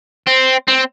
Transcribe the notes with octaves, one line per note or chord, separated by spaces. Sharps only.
C4
C4